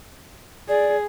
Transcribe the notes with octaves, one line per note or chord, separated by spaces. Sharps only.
G#4 D5